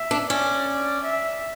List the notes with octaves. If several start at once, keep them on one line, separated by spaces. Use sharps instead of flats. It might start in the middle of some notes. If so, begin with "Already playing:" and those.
Already playing: E5
D4
C#4 D5
E5